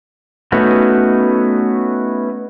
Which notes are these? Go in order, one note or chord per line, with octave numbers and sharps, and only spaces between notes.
A3 B3 C#4 D#4 F#4